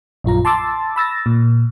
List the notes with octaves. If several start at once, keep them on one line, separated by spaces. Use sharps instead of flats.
A#1 F#2 F4 A#5
A5 C6 D6 E6 A6
B5 E6 A6 A#6
A#2